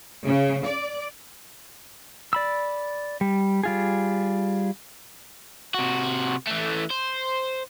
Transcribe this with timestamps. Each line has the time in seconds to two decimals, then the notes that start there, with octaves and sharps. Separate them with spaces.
0.26 C#3
0.65 D5
2.33 D5 B5 E6
3.21 G3
3.63 G3 F4 G#4
5.74 C3 F#4
6.47 E3 A3
6.90 C5